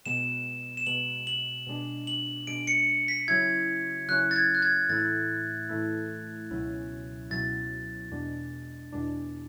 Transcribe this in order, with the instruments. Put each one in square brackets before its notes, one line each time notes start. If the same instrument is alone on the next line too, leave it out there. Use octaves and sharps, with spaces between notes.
[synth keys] B2 G#3 B3 [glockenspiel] E7
[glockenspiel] E7
[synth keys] B2 G#3 B3 [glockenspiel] F#7
[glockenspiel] F#7
[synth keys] B2 G#3 D4
[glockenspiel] F#7
[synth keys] B2 G#3 D4 [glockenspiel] D7
[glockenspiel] C#7
B6
[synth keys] C#3 F#3 C#4 E4 [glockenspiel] G#6
[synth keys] C#3 F#3 C#4 E4 [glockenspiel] F#6
[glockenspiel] A6
G#6
F#6
G#6
[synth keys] A2 E3 A3 E4 [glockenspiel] A6
[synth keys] A2 E3 A3 E4
C#2 B2 F#3 C#4 E4
[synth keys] C#2 B2 F#3 C#4 E4 [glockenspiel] A6
[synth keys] E2 B2 G#3 D4
E2 B2 G#3 D4